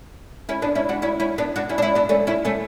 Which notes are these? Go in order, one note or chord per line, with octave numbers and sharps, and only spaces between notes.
C#4 E4
B3 D4
C#4 E4
D4 F#4
C#4 E4
C#4 E4
B3 D4
D4 F#4
C#4 E4
D4
C#4 E4
B3 D4
A3 C#4
C#4 E4
A3 C#4